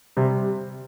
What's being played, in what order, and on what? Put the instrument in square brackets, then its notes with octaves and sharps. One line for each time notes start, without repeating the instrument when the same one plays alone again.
[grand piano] C3 [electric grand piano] G3